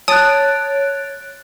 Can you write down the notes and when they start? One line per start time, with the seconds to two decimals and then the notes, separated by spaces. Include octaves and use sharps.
0.08 C#5 A5 D#6 F#6 A6 D7